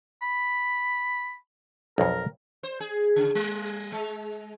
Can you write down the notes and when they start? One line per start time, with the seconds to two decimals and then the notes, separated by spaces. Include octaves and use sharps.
0.22 B5
1.98 B1 F2 A#4
2.63 C5
2.80 G#4
3.16 C#3
3.35 G3
3.92 G#3